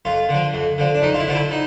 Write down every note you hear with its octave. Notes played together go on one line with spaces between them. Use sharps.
F2 F4
D3
F3
F2
D3 F3
D4
F2 D#4
F4
E4
D3 F3 F4
E4
D#4